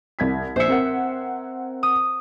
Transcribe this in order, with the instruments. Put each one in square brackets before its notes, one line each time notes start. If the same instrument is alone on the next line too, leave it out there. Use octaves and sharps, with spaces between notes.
[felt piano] C2 G#6 B6
[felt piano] A#1 C#7 [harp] C5 E5
[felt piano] C4 A#4 F#5
[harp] D#6